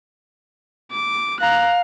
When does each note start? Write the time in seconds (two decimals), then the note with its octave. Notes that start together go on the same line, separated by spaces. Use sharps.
0.92 D6
1.40 F5 A#5 F#6